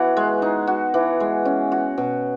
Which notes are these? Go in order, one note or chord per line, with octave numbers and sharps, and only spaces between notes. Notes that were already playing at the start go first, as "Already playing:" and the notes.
Already playing: E3 B3 F#4
G#3
D#4
F#4
E3
G#3
C#4
F#4
B2